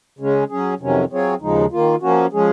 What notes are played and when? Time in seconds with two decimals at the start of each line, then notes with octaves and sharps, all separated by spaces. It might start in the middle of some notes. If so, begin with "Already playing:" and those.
0.19 C#3 G#3 C#4
0.49 F#3 C#4 G#4
0.80 F2 C3 D#3 F#3 C#4
1.10 F#3 C4 F4 G#4 C#5
1.41 D#2 C#3 F3 G#3 D#4
1.72 D#3 A#3 F4
2.02 F3 A#3 C#4 F#4
2.33 F3 G#3 C#4 G#4